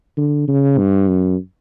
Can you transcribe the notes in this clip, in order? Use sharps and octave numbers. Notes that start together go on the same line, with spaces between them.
D3
C#3
G2
F#2